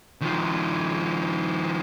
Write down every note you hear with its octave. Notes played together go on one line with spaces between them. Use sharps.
D#3 F3